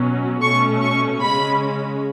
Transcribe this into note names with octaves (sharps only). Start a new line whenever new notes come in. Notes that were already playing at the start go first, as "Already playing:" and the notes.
Already playing: B2 F#3 C#4
B2 A3 C#4 C#6
C#6
C#3 G#3 C#4 B5